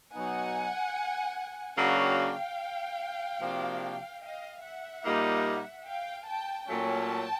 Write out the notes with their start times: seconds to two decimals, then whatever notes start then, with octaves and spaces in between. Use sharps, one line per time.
0.13 B2 F#3 B3 D#4 F#5 G#5
1.77 C#3 F#3 A#3 D4 F#4 F5 G5
3.41 C3 F3 A#3 D4 F#4
4.22 D#5 F5
4.63 E5 F#5
5.04 A#2 G3 A#3 D#4
5.86 F5 G5
6.27 G5 A5
6.68 A#2 F#3 A3 C#4 G5 A5